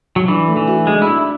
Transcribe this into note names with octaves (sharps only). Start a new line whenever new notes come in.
F#3
E3 D4
A3
E3
F#4
G#3 D4
D4 E4